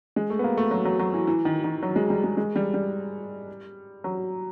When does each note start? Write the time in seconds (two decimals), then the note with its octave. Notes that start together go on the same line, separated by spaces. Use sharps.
0.16 G#3
0.30 A3
0.39 B3
0.44 A#3
0.57 A3
0.71 F#3
0.85 F#3
0.99 F#3
1.14 E3
1.27 E3
1.45 D#3
1.64 D#3
1.83 F#3
1.96 G#3
2.10 G3
2.24 G#3
2.37 G#3
2.56 G3
2.74 G3
4.04 F#3